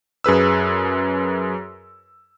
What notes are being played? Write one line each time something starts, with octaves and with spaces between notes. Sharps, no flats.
F#2 G#4 B4 E6